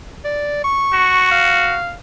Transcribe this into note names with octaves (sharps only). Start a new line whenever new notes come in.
D5
C#6
F#4
F5